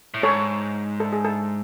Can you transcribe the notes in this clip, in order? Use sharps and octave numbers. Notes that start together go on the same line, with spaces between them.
A2
G#2 A4 C#5
A4
G#4
A4